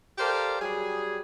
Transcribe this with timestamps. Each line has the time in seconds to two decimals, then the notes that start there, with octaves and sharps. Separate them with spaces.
0.18 G4 A4 A#4 C5 D5 F5
0.60 F#3 G3 G4 G#4